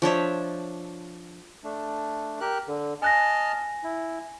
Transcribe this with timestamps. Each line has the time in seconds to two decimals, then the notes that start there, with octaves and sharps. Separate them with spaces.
0.02 F3 D4 C#5 E5
1.64 A3 D4
2.41 G4 A#4 F#6
2.67 D3
3.02 D#5 G#5 A5 F6 F#6 A#6
3.84 E4